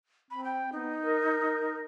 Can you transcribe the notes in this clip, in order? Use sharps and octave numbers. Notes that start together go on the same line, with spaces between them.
C4 B5
G5
B3 D#4
A#4